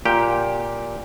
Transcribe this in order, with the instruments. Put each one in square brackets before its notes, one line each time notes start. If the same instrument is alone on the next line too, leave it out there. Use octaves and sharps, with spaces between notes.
[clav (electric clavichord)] A#2 G4 G5